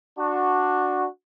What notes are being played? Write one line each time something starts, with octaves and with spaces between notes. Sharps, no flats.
D4 F#4